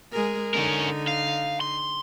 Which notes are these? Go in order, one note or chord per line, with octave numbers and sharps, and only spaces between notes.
G#3 G#4 A#4
D3 C#4 D#4 A#4
F5
C6